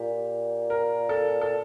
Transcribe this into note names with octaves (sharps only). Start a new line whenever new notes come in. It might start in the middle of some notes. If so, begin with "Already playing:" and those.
Already playing: A#2 G4
A#4
A4
A4